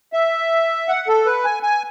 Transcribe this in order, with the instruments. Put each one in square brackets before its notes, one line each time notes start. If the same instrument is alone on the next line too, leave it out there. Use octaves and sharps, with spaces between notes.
[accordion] E5
F#5
A4
B4
G#5
G#5